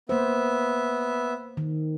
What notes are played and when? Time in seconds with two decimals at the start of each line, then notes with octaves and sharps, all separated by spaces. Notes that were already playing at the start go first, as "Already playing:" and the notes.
0.09 A#3 B3 C5 E5
1.57 D#3